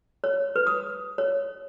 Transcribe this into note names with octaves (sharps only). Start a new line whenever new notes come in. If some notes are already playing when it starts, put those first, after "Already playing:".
C#5
B4
D#6
C#5